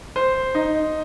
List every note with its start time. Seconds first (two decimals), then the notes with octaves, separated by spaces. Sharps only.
0.16 C5
0.55 D#4